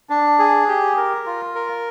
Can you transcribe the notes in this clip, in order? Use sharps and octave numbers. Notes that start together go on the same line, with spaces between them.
D4
G#4
G4
A#4
F4
A#4